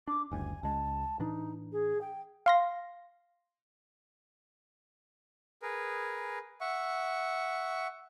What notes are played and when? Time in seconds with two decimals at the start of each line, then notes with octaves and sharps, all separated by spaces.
0.08 D4 D6
0.32 F#1 D2 G3 G#5
0.63 C#2 G#3 A5
1.19 A2 E3 D4 D#4
1.72 G#4
2.01 G5
2.46 F5 C6 A#6
5.62 G#4 A#4 B4
6.61 E5 F#5 C#6